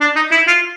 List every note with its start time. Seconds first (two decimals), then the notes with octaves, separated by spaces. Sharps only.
0.01 D4
0.16 D#4
0.31 E4
0.48 F4